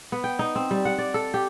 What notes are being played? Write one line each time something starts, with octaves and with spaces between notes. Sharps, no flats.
B3
G5
D#4
C4
G3
F#5
D5
A4
G4